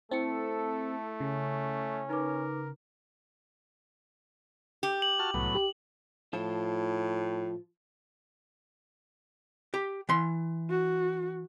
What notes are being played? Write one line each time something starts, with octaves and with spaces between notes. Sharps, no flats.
A3 C4 E4 A4 C#7
C#3 C#4
D#4 A#4 B4 D6
G4
F#7
F#4 A5 F6
C2 A2 F#3 B3
G4
A2 F3 F4
G4
E3 C6
F#4